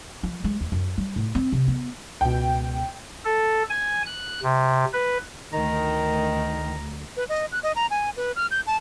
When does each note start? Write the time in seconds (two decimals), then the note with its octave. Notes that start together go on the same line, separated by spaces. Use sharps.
0.23 F3
0.44 G#3
0.61 D#2
0.72 F#2
0.98 G3
1.16 A2
1.35 C4
1.52 C3
1.68 B3
2.21 C#2 B2 G5
3.25 A4
3.70 G#5
4.06 F#6
4.43 C3
4.93 B4
5.53 D2 D#3 A#5
7.17 B4
7.29 D#5
7.52 F#6
7.63 D#5
7.76 A#5
7.91 G#5
8.17 B4
8.36 F6
8.51 G6
8.67 A5